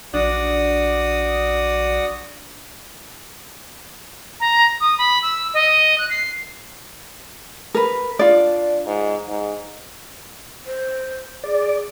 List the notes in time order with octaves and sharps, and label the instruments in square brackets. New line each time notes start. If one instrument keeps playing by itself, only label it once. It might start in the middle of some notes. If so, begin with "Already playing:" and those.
[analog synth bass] A#1 [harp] D4 [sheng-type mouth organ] F#4 D5 D#6
[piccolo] A#5
D#6
B5
E6
D#5
F#6
C7
[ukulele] A#4 B4
[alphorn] D4 [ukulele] F4 D5
[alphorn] G#2
G#2
[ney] C5
[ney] G#4 [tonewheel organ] D5